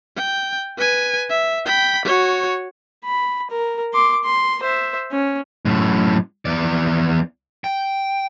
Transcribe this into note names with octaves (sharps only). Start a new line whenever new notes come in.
G5
B4 G#5
E5
G5 B5
F#4 C#5
B5
A#4
C6 D6
C6
C5 E5
C#4
F#2 A2
E2 D5
G5